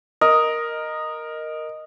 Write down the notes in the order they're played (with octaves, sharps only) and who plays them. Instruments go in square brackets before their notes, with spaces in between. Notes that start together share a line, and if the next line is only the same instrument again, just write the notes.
[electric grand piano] A#4 [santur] D#5